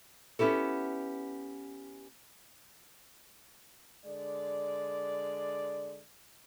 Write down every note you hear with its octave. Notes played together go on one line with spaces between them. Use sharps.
B3 C#4 E4 G4 A4
D3 G#3 D5